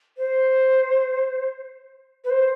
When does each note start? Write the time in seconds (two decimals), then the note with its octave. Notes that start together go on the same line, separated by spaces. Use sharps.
0.17 C5
2.24 B4
2.30 C5